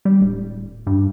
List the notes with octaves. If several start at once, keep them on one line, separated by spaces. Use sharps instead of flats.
G3
D1
G2